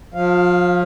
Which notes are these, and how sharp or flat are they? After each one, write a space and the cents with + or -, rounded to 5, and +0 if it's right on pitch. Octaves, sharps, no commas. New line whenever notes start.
F3 +35 F5 +0